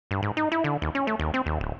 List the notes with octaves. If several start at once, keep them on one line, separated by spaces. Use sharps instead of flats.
G2
G#2
D#4
E4
D3
D#2
C#4
A3
D#2
C4
D#2
D1